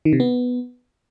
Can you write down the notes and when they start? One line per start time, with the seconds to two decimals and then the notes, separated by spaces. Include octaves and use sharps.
0.05 D#3
0.13 C3
0.20 B3